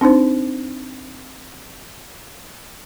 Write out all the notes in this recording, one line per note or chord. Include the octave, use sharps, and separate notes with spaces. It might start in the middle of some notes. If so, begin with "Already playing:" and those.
C4 D4 D#4 C5